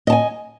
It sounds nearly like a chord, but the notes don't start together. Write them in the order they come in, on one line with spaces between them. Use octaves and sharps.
D#5 A5 G#5